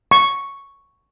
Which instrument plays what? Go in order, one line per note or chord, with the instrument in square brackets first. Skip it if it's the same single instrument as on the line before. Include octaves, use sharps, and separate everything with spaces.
[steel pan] C#6